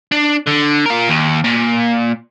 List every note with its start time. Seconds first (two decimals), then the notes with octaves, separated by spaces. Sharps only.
0.12 D4
0.47 D3
0.86 F4 A#4
1.08 D#2
1.44 A#2